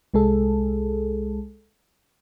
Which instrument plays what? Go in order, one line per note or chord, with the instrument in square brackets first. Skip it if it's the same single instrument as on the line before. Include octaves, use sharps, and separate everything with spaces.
[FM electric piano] C2 G#3 G#4 A4